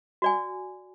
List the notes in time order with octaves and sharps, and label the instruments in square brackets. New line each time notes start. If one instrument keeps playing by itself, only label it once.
[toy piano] F#4 D5 G#5